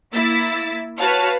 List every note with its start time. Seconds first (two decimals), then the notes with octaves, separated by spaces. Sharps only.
0.13 A#3 E4 E6 A6 B6
0.98 F#4 B4 C#5 F5 A5 F6